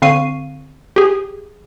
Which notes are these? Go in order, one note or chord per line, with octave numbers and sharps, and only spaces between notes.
D3 C4 F5 C#6 C7 D#7
G4 G#4